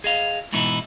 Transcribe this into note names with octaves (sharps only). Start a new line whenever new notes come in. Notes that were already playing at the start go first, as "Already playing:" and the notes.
G#4 D#5 F5
G#2 B2 E3 D#4 E4